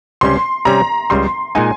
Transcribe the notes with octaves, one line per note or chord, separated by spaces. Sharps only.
C#2 C3 G3 C#4 C6
C3 G3 C#4 A#5
C#2 C#3 G3 C6
A#2 G#3 D#4 G#5